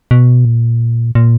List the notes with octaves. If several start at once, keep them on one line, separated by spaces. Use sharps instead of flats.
B2
A#2
A#2